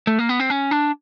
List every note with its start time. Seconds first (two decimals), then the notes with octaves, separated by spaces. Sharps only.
0.07 A3
0.19 A#3
0.29 B3
0.40 C4
0.50 C#4
0.71 D4